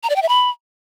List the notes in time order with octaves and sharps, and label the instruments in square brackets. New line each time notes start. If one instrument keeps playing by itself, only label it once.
[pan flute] A#5
D5
G5
E5
B5